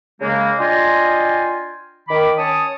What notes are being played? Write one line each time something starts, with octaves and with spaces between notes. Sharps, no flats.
C#3 G#3 A#3
D4 F4 D#5 G5 G#5 C6
D#3 B5 D6
C#4 C#5 A5 D#6